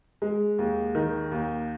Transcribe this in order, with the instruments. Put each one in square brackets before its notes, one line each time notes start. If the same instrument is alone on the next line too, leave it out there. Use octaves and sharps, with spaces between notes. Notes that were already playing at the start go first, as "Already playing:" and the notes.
[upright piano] G#3
D#2
D#3
D#2